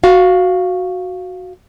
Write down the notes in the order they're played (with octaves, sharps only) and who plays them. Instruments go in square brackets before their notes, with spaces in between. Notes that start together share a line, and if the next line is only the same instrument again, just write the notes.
[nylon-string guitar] F#4 F5